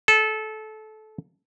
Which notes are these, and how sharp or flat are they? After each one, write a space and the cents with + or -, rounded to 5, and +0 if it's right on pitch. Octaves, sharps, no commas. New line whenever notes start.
A4 -20